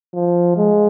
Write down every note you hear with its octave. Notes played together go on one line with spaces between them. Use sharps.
F3
G#3